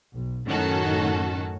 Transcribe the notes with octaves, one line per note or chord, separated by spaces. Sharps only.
B1
F#2 A2 D#3 C#4 F#4 A4